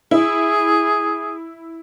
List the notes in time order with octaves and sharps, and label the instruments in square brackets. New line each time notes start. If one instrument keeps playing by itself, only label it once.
[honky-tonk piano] E4 [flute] G#4